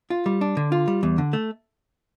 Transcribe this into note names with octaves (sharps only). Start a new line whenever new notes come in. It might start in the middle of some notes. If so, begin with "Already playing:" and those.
F4
G3
D4
D3
F4
G3
E2
D3
A3